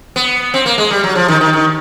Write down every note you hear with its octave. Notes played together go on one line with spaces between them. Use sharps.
B3
C4
A#3
G#3
G3
F#3
F3
D#3
D#3
D#3